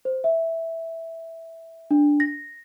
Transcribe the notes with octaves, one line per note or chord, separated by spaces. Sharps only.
C5
E5
D4
A#6